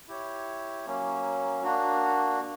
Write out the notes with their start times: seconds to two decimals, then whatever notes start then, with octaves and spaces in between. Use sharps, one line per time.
0.08 E4 G4 C#5
0.86 F#3 A#3 C#4
1.64 A#3 D4 F#4